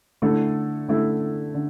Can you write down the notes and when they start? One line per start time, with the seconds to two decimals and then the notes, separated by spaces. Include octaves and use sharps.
0.22 D3 A3 E4 A4
0.88 D3 A3 E4 A4
1.54 D3